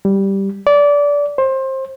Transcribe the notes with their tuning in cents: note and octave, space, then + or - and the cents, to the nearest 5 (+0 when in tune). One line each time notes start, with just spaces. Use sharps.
G3 -5
D5 -20
C5 +25